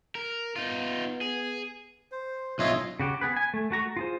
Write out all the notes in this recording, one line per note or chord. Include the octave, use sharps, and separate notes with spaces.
A#4
B3 D#4 F4
G#4
C5
B1 F4 C#5 D#5 E5
C#3 F#4 G4
B3 G#4 B4
G#5
A3
A3 F#4 A#5 C#6
F4 G#4 C5